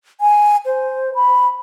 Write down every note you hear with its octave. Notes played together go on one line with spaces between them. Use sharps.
G#5
C5
B5